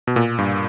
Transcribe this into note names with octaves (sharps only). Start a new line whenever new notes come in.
B2
A#2
G2